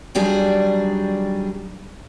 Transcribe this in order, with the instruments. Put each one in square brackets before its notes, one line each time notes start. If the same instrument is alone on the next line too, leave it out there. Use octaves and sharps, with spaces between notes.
[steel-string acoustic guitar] D#3 F#3 G3 D4 G#4